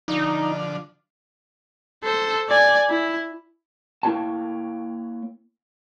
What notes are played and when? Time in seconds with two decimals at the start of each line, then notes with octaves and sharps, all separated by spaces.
0.08 D3 F3 D4 D#4
2.04 A4 C5
2.49 D5 G#5
2.90 E4
4.03 A#3 E4 G4 C#5 G5 A5